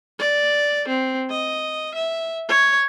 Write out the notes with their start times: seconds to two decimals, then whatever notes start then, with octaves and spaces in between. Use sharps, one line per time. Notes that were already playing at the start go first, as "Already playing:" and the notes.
0.19 D5
0.88 C4
1.30 D#5
1.95 E5
2.48 C#5